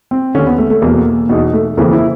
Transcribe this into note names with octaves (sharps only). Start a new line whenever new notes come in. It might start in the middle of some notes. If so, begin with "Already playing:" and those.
C4
D#2 D3 C#4
B3
A3
A3
E2 B2 A#3
E2 B2 D#4
A3
F2 C#3 E3 A#3
E4